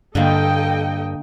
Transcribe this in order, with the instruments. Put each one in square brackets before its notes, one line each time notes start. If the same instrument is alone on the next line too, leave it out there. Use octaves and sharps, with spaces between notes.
[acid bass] G2 [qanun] D3 A#3 [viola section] A4 D#5 G5